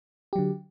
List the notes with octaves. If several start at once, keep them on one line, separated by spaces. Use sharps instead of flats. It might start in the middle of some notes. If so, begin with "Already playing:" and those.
D3 F#3 G4